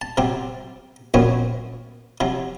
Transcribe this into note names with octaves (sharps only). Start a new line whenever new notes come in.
A5
C3 F#3 C4 G4
A#1 F#2 A#2 B3 C4 C#5
C3 F3 F#3